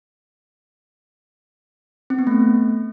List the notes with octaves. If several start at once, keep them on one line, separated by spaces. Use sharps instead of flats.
C4
B3
A3